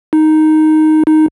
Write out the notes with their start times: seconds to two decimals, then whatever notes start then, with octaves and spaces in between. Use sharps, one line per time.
0.13 D#4
1.07 D#4